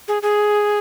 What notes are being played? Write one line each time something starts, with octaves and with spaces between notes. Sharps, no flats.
G#4
G#4